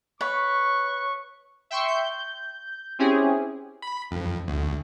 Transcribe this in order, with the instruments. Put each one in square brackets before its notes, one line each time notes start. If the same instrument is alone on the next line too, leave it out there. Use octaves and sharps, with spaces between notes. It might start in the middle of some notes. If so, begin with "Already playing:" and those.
[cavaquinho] B4 [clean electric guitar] C#5 [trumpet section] C#6
[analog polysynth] E5 G5 C6 C#6
G6
C4 C#4 E4 G4 G#4
[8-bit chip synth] B5
F2
D2